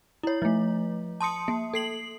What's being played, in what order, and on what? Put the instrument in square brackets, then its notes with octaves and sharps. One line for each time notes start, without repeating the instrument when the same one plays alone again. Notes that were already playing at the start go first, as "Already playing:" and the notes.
[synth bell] E4 C#5
F3 A3
A5 C6 D#6 C#7
A#3
A4 C7 F#7